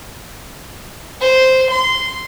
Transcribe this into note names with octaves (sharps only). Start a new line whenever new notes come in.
C5
C6